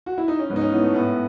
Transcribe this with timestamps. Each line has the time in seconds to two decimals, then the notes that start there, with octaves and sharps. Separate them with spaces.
0.06 F#4
0.18 E4
0.28 D#4
0.39 C#4
0.50 G#2 B3
0.56 D#4
0.61 C#4
0.72 E3 B3
0.83 A3
0.94 A2 B3